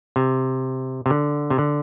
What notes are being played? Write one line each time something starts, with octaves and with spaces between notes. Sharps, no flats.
C3
C3
D3
C3
D3